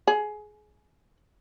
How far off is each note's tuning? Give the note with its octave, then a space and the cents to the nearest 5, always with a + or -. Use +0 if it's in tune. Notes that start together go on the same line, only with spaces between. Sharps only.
G#4 +20